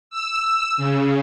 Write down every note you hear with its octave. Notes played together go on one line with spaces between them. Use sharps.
E6
C#3